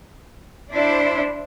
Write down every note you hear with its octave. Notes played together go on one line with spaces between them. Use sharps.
D4 E4 C5